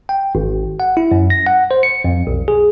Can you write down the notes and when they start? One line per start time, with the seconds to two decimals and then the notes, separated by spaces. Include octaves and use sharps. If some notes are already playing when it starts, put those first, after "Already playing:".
0.09 G5
0.35 G#1
0.80 F#5
0.97 E4
1.11 F#2
1.30 A#6
1.47 F#5
1.71 C5
1.83 C#7
2.04 F2
2.27 B1
2.48 G#4